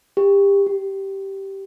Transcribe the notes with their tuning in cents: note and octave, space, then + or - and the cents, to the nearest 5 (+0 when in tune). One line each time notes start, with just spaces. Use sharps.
G4 +25
G4 -10